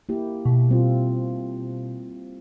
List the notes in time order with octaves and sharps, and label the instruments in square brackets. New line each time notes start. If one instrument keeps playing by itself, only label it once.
[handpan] A#3 E4 G4
[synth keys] B2
[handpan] G3 C4 F4